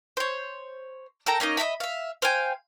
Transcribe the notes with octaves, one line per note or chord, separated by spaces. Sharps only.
C5 C#5
A4 A#4 G5 A#5
A#3 C#4 D#4 D#5
D#5 E5 A#5 B5
E5 F5
C5 F5 G5 G#5